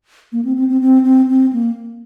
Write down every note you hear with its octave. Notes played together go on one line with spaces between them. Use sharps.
A#3
C4
C4
C4
C4
C4
C4
A#3